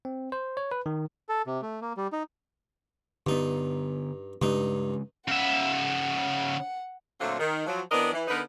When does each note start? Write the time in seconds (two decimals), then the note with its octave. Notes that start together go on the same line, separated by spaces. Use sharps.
0.05 C4
0.32 C5
0.57 C#5
0.72 B4
0.86 D#3
1.29 A4
1.47 C3
1.62 A3
1.82 A#3
1.97 G3
2.13 D#4
3.26 G2 D3 B3 D#4
4.42 G2 C#3 G#3 D#4
5.28 C#3 E5 F#5
7.21 A#2 D3 F#3 A3 C4 F4
7.40 D#3
7.66 F3 F#3
7.91 E3 B3 C4 D4 A#4 D#5
8.13 E3
8.28 D3 B3 D#4 A#4 B4